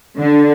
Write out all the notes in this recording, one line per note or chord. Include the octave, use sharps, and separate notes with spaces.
D3